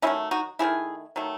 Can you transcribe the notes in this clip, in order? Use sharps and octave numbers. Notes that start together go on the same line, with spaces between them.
D#3 F#3 A3 C#4 E4
D#4 F#4
D#3 F#3 A3 E4 G#4
D#3 F#3 A3